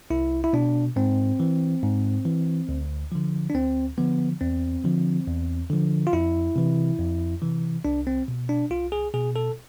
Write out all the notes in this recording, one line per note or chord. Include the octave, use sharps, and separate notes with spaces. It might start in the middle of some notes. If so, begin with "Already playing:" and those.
C2 E4
E4
B2 D4
G#2 C4
E3
G#2
E3
D2
D3 F3
D4
D2 C4
D3 F3 B3
E2 C4
D3 F3
E2
D3 F3
F4
F2 E4
C3 E3
F2
C3 E3
C2 D4
C4
B2
D4
C2 F4
G#4
B2 G#4
A4